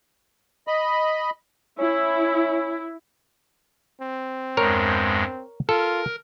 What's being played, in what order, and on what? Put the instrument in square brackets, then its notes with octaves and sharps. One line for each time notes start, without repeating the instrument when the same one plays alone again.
[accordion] D#5 B5
[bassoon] C#4 [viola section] E4
[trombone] C4
[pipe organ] E2 G2 G#3 [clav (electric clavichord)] A#4 C#5
[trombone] F4 [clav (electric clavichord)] A4 [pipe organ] A#4